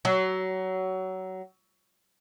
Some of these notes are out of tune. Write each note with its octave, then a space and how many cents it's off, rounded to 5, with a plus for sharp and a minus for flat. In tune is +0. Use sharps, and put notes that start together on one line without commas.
F#3 +20